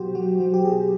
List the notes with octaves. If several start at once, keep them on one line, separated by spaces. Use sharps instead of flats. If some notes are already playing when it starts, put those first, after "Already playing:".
Already playing: B2 F#3 F#4 G4 C5
F#3 F#4
F#3 F#4
G4
B2 G#4